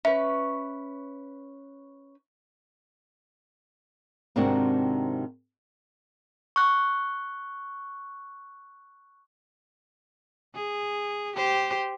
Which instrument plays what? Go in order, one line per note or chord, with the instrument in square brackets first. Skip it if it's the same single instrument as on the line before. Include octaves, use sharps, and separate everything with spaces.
[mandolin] C#4 B4 [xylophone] E5
[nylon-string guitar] G#2 C3 D#3 C4 D4 F#4
[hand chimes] C#6 F#6
[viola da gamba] G#4
G4 C5